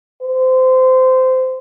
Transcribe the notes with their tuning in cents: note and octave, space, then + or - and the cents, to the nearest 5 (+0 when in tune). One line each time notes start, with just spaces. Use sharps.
C5 -20